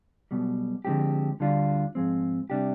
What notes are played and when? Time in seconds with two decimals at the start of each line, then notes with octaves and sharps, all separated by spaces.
0.31 B1 B2 G3
0.85 D3 F3 G#3 C4 G4
1.40 D2 D3 G3 D4 F4
1.95 G#2 F3 G#3 C4
2.50 C3 G3 D4 G4